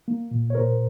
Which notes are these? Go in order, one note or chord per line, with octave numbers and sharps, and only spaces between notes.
A#3
A#2
C#5
A#2 A#4 C5